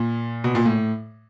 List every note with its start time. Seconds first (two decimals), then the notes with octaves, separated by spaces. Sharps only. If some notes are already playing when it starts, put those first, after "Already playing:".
Already playing: A#2
0.44 B2
0.55 A#2
0.66 A2